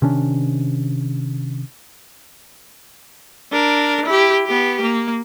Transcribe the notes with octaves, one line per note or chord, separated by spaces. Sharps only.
C3 D#3 C#4 D4
D4 A#4
E4 G4
B3 G4
A#3